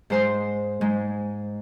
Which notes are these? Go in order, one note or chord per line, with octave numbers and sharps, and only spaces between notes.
G#2 G#3 C5 C6
G#2 G#3